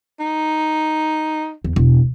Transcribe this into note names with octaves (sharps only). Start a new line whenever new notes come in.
D#4
E2
E1